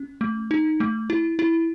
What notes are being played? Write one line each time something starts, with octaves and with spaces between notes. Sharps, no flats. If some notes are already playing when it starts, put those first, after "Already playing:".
Already playing: C#4
A3
D#4
A3
E4
E4